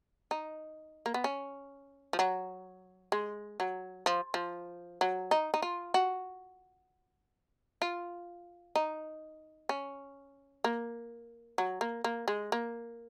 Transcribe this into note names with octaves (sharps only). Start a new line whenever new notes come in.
D#4
A#3
B3
C#4
F3
F#3
G#3
F#3
F3
F3
F#3
D#4
D#4
F4
F#4
F4
D#4
C#4
A#3
F#3
A#3
A#3
G#3
A#3